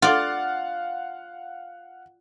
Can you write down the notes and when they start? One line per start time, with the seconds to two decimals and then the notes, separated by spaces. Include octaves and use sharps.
0.02 F4 D5 F5 F#5